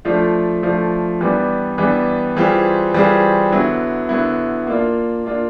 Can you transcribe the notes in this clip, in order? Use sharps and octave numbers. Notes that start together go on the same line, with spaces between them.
F3 A3 D4 F4
F3 A3 D4 F4
E3 G3 B3 D4
E3 G3 B3 D4
E3 G3 C4 F4 G#4
E3 G3 C4 F4 G#4
D3 F#3 B3 E4
D3 F#3 B3 E4
A#3 D4 F4
A#3 D4 F4